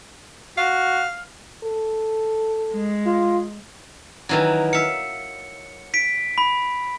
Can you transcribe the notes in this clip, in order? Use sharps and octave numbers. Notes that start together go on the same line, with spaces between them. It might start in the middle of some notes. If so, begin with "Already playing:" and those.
F#4 F5
A4
G#3
F4
D#3 E3 F#3
E5 F5 C#7
B6 D7
B5